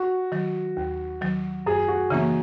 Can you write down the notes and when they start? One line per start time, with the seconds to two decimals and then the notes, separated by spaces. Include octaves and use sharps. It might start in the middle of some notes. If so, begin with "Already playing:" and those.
Already playing: F#4
0.32 D#3 F#3
0.77 D#2
1.22 D#3 F#3
1.66 F#2 G#4
1.88 F#4
2.10 C#3 E3 A#3 C#4 D#4